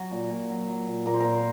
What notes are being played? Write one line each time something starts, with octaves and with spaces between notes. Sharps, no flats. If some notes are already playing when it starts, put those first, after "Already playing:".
Already playing: F#3 F#4
A#2
A#2
F#3
F#3
A#2
A#2 A#4
C5
A#2 A#4
C5